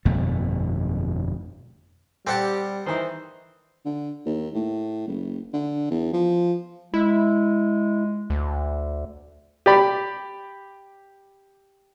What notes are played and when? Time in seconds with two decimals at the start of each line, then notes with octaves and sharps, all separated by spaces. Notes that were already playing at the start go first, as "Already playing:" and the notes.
0.05 G1 F2 B2 A3
2.27 G3 C4 G4 A4 D5 F#5 G5 A5
2.86 D#3 E3 D#4 C5
3.85 D3
4.26 D#2
4.54 A2
5.08 F#1
5.54 D3
5.90 E2
6.13 F3
6.94 G#3 E4
8.30 D2
9.66 G4 D5 B5